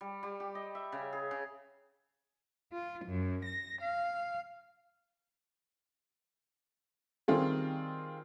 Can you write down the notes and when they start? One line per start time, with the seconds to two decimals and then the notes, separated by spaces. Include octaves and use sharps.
0.01 G3
0.23 G3
0.40 G4
0.55 D#5
0.75 E5
0.92 C#3
1.13 G#4
1.31 C#3
2.72 F4
3.04 F#2
3.45 A#6
3.81 F5
7.28 D#3 G3 C4 F4 G#4